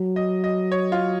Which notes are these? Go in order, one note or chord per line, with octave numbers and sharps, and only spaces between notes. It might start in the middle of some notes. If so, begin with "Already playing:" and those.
Already playing: F#3
D#5
D#5
C#5
F4